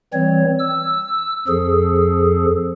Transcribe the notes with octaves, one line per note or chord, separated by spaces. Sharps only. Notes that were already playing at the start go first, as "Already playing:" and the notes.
E3 G3 C4 C#5
E6
F2 F3 G#4 A4